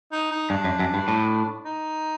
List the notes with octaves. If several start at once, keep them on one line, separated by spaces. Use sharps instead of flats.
D#4
D#4
G2 D4
F#2
F#2
G2
A2
D#4